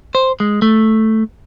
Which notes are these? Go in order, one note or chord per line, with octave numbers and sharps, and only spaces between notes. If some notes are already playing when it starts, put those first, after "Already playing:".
C5
G#3
A3